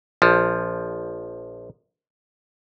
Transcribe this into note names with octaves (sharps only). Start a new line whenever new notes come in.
A#1 F3